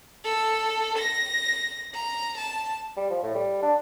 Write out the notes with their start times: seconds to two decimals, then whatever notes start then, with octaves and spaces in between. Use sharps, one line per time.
0.25 A4
0.98 A#6
1.94 A#5
2.38 A5
2.97 G3
3.10 F3
3.23 A2
3.35 G3
3.62 D4